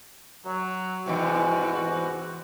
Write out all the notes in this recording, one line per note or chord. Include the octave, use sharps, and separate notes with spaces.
F#3
E2 G#2 C3 E3 F#4